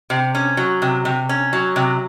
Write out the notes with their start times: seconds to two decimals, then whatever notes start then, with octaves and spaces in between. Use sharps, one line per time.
0.10 C3
0.35 C#4
0.57 F#3
0.82 C3
1.05 C3
1.29 C#4
1.53 F#3
1.76 C3